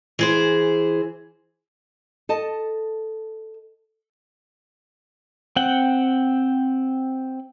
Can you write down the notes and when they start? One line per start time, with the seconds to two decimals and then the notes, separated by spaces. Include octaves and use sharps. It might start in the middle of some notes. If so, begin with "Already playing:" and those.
0.19 E3 G#4 C5
2.29 A4 D#5 A5
5.56 C4 F#5 G5